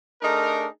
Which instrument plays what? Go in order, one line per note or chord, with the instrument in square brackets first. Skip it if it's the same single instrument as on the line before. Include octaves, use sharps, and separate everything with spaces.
[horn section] A3 D4 D#4 G#4 A#4